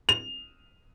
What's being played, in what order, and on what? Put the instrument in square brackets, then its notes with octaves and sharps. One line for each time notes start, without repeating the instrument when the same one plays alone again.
[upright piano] F7